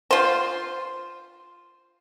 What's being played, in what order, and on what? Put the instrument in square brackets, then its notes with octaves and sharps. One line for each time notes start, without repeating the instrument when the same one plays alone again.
[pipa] F4 C5